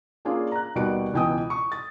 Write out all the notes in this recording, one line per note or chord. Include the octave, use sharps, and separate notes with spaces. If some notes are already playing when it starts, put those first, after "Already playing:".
A#3 C#4 D4 F4 G#4
A#5 F#6
D#2 B2 G3 F#4 D7
C#2 B2 E3 G5 G#5 D#6
C#6
A6